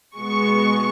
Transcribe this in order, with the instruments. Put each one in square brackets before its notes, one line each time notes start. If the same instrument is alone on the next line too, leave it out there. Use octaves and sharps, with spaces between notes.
[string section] B2 G#3 B3 C#6